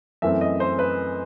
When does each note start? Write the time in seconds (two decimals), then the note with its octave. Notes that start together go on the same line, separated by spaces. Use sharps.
0.22 F#2 E3 A3 C4 E5
0.41 D#5
0.60 C5
0.79 B4